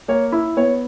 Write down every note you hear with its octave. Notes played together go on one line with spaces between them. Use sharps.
A#3 C#5
E4
B3 C#5